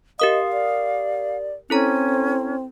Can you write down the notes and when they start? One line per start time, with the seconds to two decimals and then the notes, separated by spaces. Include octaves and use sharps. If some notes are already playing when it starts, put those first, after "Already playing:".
0.20 G4 A#4 D#5 F5 D#6
0.53 D5
1.70 C4 C#4 E4 A4 A#5